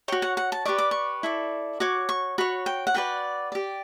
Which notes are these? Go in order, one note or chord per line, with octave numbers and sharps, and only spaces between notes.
F#4 C#5 G5
F#5
F#5
A5
G4 B4 D5 C#6
D6
C#6
E4 A4 D5
F#4 C#5 D6
C#6
F#4 C#5 B5
G5
F#5
F#4 B4 D5 G5
G4 D5